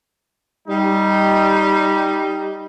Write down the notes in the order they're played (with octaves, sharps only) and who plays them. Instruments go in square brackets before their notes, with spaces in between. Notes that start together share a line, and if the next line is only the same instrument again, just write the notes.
[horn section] G3 D#4